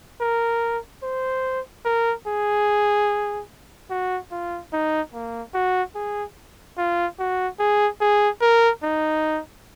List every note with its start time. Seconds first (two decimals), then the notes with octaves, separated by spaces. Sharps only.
0.21 A#4
1.03 C5
1.85 A#4
2.27 G#4
3.90 F#4
4.31 F4
4.73 D#4
5.14 A#3
5.54 F#4
5.95 G#4
6.78 F4
7.19 F#4
7.59 G#4
8.01 G#4
8.41 A#4
8.83 D#4